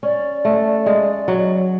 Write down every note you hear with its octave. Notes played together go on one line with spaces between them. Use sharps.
C#4 D5
A3
G#3
F#3